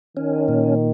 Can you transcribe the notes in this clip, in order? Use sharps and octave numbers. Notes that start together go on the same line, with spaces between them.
D#3 C#4
A#2